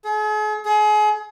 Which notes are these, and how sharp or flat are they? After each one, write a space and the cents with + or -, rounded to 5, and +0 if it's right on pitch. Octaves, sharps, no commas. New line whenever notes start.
G#4 +40
G#4 +30